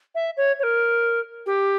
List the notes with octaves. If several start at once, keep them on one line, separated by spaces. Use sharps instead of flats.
E5
C#5
C#5
A#4
G4